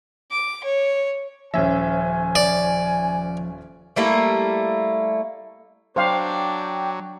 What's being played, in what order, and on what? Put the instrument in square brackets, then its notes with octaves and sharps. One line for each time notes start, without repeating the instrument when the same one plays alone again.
[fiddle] D6
C#5
[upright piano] D#1 C#4 E5 [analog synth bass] F3 [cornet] G#5
[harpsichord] D5
[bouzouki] G3 A3 A#3 E4
[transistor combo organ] F#3 [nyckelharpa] D4 D5 [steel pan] C5 F5 [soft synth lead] G5